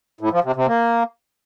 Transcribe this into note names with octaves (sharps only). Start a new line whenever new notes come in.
A2
F3
C3
C3
A#3